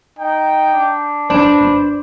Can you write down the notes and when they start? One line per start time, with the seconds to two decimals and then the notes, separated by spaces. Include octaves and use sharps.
0.19 D#4 G5
0.73 D4
1.30 F#1 D4 B4 C5
1.61 G1